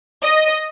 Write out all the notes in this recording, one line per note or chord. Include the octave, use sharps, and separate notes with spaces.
D#5